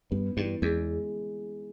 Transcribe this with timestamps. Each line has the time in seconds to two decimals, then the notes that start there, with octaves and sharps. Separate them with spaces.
0.11 G2 B3
0.37 G2 E3
0.62 E2 G#3